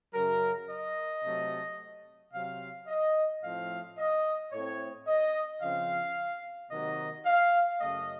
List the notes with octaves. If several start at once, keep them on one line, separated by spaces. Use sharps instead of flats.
F#2 C#3 F#3 A#4
D#5
C3 F#3 A3
C3 F#3 C4 F5
D#5
A2 F3 A3 C4 F5
D#5
A2 A3 C4 C#5
D#5
C#3 F3 C4 F5
C3 D#3 F#3 A#3 D#5
F5
F#2 C#3 A3 D#5